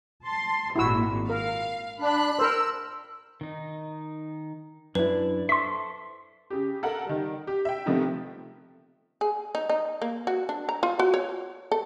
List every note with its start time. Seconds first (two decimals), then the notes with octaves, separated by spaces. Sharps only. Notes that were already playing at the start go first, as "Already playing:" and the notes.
0.23 A5 C6
0.76 G#1 A#2 E4 F#4 E6
1.29 A#4 F5
2.01 D4 B5 F#6
2.39 A#4 C5 E6
3.41 D#3 D#4
4.95 F#2 D4 E4 B4
5.49 A4 C5 E5 C6 C#6 B6
6.50 C#3 G4
6.83 A4 A#4 F#5
7.05 D#3 G3
7.47 G4
7.65 E5 G5
7.86 C3 D#3 F3 A3 B3 C4
9.21 G#4
9.55 D#4
9.69 D#4
10.02 A#3
10.27 F#4
10.49 D4
10.69 A#5
10.83 F4
10.99 F#4
11.14 C#5
11.72 A4